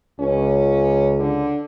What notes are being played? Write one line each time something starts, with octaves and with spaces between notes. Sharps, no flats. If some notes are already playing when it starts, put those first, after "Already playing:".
C#2 C#4
D3